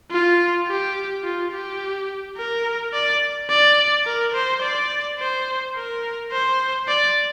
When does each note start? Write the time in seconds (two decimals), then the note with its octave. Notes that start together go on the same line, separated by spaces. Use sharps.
0.11 F4
0.67 G4
1.24 F4
1.52 G4
2.37 A#4
2.93 D5
3.49 D5
4.06 A#4
4.34 C5
4.62 D5
5.19 C5
5.76 A#4
6.31 C5
6.88 D5